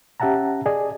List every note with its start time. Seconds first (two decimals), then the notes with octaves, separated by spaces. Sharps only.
0.20 C#4 G4 E5 F#5 A5 A#5
0.66 G#4 D5 D#5 G#5